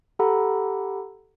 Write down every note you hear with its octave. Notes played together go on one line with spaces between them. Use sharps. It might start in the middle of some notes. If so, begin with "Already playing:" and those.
G4 A4 F#5 A#5 B5